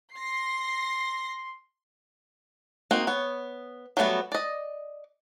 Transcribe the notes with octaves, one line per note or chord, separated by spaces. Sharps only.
C6 A#6 C7
A#3 C4 D#4 F#4
B3 C#5
F#3 G3 A3 B3 F#4
D5 D#5